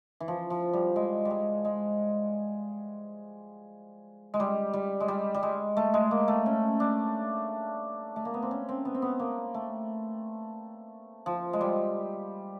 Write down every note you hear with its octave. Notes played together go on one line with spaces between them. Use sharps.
E3
F3
F3
G3
G#3
G3
G#3
G#3
G#3
G3
G3
G#3
G3
G3
G#3
A3
G#3
A#3
A3
C#4
D4
A3
A#3
B3
C4
C#4
C4
B3
C4
B3
A#3
A3
F3
G#3
G3